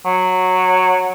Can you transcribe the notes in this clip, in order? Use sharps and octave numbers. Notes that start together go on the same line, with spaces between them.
F#3